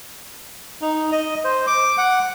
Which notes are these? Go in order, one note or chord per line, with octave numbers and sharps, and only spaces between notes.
D#4
D#5
C5
D6
F#5